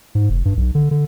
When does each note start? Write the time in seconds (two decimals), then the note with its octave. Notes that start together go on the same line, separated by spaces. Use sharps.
0.15 G#2
0.30 F1
0.45 G2
0.57 B1
0.75 D3
0.91 D3